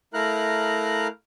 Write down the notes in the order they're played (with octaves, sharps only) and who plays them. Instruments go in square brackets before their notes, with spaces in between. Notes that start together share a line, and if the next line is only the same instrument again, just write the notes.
[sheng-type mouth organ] A3 E4 A#4 F5 A#5 F#6